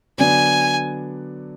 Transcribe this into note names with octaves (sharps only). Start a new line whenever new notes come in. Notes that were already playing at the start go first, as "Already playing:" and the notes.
D3 F#3 B3 D4 G#5